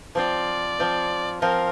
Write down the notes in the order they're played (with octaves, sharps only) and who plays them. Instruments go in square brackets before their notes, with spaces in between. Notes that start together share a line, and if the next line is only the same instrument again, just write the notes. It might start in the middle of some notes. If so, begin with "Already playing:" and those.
[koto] F3 C4 F4 [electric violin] D5
[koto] F3 C4 F4
[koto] F3 C4 F4 [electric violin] A#4